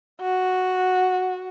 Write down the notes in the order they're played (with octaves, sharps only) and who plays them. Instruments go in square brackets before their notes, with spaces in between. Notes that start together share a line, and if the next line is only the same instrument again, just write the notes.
[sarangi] F#4